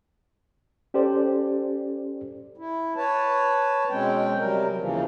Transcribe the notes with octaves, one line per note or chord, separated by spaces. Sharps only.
C#4 G4 A4 C5 D5
E4
B4 C#5 A5
B2 G#3 C4 C#4 G5
C3 F#3 G3 A#4
D#2 C#3 E3 F3